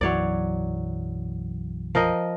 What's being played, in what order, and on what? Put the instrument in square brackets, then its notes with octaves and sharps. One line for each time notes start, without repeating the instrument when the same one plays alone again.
[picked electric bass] B1 F#2 E3 [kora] F#3 C#5 D5
[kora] F3 A#4 D#5